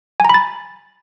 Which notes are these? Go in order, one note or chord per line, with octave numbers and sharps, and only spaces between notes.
G#5 A#5 B5 A6